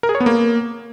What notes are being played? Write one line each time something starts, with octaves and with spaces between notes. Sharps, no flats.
A#4
G#4
C#5
B3
A#3